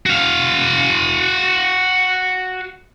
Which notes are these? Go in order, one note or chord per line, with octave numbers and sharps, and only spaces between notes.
F#4 F5